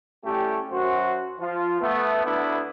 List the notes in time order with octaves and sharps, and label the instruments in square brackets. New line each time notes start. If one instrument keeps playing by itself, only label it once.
[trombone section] A2 G3 A3 C#4 G4
F#2 F#4 C5
F3 F4
A3 B3
D2 A3 B3 D4 E4 B4